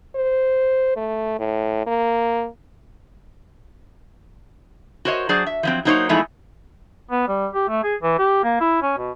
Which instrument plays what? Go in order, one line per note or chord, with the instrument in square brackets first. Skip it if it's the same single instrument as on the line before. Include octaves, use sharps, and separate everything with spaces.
[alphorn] C5
A3
A2
A#3
[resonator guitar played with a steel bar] F#4 A#4 C5 C#5 D#5
F#3 D4 G#4 C5 D5
E5
F3 F#3 C4
F#3 A#3 D#4 C5 C#5
E2 F3 G#3 A3 D#4 E4
[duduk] B3
G3
G4
A3
G#4
E3
G4
A#3
E4
C#4
B2